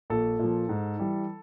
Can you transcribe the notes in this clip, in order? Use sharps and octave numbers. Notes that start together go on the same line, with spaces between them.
A#1 A4
A#2 F3
G#2
E3 G3